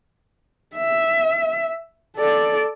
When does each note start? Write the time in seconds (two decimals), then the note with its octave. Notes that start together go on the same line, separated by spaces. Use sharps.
0.76 E5
2.17 A4 D5